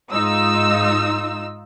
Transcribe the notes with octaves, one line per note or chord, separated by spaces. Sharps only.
G#2 D#4 F4 E6